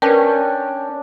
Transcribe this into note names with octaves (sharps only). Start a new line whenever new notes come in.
C#4 D4 A#4 B4 G5